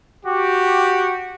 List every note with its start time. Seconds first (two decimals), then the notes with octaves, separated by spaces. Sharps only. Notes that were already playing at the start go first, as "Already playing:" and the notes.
0.25 F#4 G4